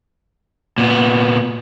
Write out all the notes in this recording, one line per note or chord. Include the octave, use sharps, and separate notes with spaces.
A#2 B3